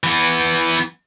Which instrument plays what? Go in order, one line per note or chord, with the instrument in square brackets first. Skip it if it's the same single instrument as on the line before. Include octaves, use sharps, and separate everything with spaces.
[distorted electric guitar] E3 B3